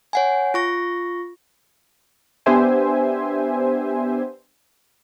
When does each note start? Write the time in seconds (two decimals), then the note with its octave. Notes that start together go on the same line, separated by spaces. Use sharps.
0.13 C#5 F#5 G#5
0.54 F4 C#6 A#6
2.46 B3 D4 G4 C5 E5 G#5